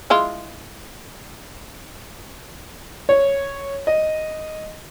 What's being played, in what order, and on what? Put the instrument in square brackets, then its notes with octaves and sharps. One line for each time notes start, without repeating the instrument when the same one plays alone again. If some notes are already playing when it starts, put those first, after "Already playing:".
[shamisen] G#3 E4 F4
[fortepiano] C#5
D#5